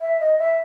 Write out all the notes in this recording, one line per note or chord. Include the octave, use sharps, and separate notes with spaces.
E5
D#5
E5